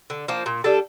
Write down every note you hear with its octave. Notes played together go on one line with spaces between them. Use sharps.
D3
F3 A#3
A#2
G3 D4 A4